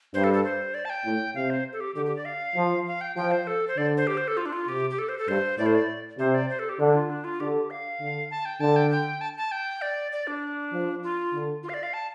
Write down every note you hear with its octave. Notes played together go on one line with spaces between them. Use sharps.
G2 C5
A4
A4
C5
D5
A5
G5
A2
C3 F5
C5
A4
G4
D3 G4
G4
D5
F5
F3
F5
G5
F3 G5
C5
A4
C5
D3 D5
C5
G4
C5
A4
F4
D4
F4
C3 G4
G4
A4
C5
A4
G2 C5
A2 D5
C5
D5
C3 C5
D5
C5
A4
G4
D3 D4
F4
D4
F4
D3 G4
F5
D3
A5
G5
D3 A5
G5
G5
A5
A5
G5
D5
D5
D4
F3
F4
D3
F4
F5
D5
F5
A5